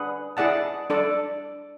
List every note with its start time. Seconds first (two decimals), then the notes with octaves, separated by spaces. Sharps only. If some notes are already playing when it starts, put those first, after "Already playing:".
Already playing: D4 G#4 B4 F#5
0.37 E4 G#4 D5 F#5 A5
0.90 D4 A4 D5